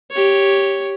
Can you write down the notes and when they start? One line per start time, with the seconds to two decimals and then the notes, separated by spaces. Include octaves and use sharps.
0.11 G4 C#5